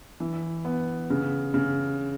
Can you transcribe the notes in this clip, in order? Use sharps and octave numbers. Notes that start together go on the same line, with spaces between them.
E3
B3
C#3
C#3